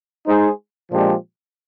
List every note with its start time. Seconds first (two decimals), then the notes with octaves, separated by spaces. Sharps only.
0.27 G#3 D#4 G#4 C5
0.91 A#2 F3 G#3 D4 G4